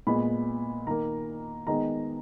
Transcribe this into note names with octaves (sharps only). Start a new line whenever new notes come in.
A#2 G#3 B3 B5
D#3 A#3 A#5
D#3 G#3 B3 A#5